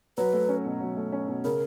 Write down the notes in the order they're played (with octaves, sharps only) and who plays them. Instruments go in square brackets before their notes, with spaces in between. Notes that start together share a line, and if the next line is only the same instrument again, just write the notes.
[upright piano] F#3 [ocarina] B4
[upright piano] A3
C#4
B2
F#3
A3
C#4
B2
[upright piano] C#3 [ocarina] A#4